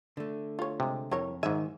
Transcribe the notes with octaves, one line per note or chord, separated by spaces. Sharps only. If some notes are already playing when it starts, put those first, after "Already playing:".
D3 A3
F4 C#5
C3 G#3
F2 E4 A#4 C#5
G#2 D#3 E5 G#5